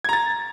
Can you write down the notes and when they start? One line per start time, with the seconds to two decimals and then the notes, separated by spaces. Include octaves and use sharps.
0.04 G#6
0.09 A#5
0.13 A6